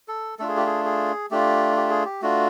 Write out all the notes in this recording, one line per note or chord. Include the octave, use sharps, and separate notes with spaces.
A4
A3 D4 F4 A4
G#4
G4
G#4
G#4
A3 D4 F4 G4
G4
G#4
G4
A3 D4 F4 F#4